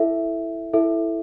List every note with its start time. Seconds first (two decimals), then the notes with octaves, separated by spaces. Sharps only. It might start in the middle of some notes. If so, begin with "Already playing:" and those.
Already playing: E4 A4 E5
0.73 E4 A4 E5